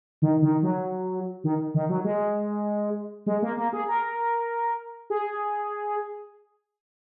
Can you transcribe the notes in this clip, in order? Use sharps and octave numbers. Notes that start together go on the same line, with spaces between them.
D#3
D#3
F#3
D#3
D#3
F#3
G#3
G#3
A#3
A#3
G#4
A#4
G#4